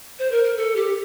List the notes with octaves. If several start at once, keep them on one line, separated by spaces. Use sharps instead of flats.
C5
A#4
A#4
A4
G4